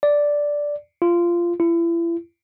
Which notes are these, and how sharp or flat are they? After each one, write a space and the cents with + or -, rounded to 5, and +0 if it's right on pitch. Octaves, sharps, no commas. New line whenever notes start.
D5 -5
F4 -15
E4 +35